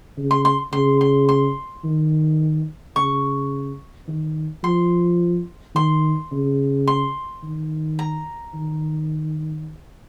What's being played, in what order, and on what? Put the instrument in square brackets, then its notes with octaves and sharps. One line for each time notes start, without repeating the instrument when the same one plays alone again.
[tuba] C#3
[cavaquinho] C6
C6
[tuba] C#3 [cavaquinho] C6
[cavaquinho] C6
C6
[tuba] D#3
[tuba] C#3 [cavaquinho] C#6
[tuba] D#3
[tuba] F3 [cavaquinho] C6
[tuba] D#3 [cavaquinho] C6
[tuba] C#3
[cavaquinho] C6
[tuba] D#3
[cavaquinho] A#5
[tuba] D#3